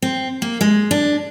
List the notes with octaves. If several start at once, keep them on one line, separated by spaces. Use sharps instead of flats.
C4
A#3
G#3
D4